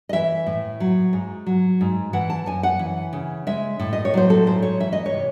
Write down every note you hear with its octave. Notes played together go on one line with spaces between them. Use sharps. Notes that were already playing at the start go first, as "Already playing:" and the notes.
D#5
E3 E5
A2
F#3
G#2
F#3
G#2
E3 F#5
A5
F#2 G#5
F#5
E3
C#3
G#3 E5
A2
D#5
C#5
F#3 C5
A4
G#2 C5
C#5
E3 E5
D#5
C#5
C3